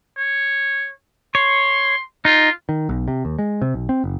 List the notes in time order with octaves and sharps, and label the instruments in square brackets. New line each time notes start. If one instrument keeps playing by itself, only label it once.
[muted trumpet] C#5
[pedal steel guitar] C#5 [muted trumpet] C6
[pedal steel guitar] D#4 [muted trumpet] F4
[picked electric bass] D#3
B1
C3
D#2
G#3
C3
B1
C4
F#1